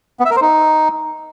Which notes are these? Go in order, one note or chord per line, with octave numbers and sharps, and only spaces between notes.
B3
E5
A#4
C5
D#4